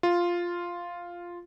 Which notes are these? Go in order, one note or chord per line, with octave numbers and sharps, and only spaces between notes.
F4